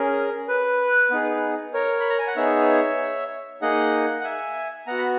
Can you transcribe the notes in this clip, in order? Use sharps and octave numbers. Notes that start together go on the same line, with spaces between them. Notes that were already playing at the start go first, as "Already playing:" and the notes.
Already playing: C#4 G#4 A#4
B4
B3 D#4 G#4
A#4 C#5
B5
A#5
G#5
F#5
B3 D#4 G#4 C#5 E5
A#3 D#4 G#4 D#5 F#5
F#5
E5 G#5
B3 F#4 F#5 A#5
B5